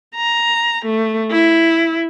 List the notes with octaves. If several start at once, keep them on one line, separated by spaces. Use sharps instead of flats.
A#5
A3
E4